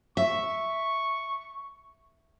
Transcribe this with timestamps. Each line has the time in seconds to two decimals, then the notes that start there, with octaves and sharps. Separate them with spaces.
0.17 E5 C#6